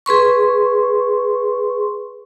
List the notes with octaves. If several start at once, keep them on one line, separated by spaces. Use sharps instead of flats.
G#4 B4 C6 C#6